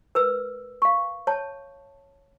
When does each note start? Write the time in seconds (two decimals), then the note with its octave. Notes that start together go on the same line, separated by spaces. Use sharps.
0.15 A#4 B4 E6
0.82 F5 C#6
1.27 C#5 A5